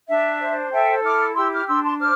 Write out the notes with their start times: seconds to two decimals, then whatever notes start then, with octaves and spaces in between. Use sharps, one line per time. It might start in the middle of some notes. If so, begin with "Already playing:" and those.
0.08 D4 E5
0.40 C5
0.72 A4 E5 G5
1.03 E4 D6 F6
1.35 G4 C6 E6
1.52 D6 F6
1.67 D4 C6 E6
1.83 A5 C6
1.99 C5 D6 F6